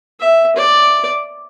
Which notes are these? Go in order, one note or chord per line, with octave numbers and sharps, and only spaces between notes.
E5
D5